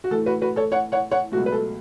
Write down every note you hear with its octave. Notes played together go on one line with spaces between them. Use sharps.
F#4
A2 E3 A3 A4
F#4 B4
F#4 B4
A4 C#5
C#5 F#5
C#5 F#5
C#5 F#5
C#2 B2 F#3 A3 F#4
B4
A4